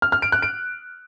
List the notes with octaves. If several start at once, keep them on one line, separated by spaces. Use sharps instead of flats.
F6
F6
D7
F#6
D7